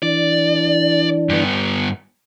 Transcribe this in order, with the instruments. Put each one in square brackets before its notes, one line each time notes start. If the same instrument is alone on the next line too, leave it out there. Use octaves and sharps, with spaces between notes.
[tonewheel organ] E3 D4 [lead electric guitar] D5
[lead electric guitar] G2 B3